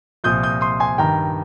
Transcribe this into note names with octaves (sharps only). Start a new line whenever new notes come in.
C2 A#2 F3 D#6 G6
D#6 G6
C6 D#6
G#5 C6
G2 D#3 G5 A#5